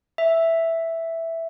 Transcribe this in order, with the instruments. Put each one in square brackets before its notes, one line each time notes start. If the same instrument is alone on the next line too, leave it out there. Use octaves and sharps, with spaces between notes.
[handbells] E5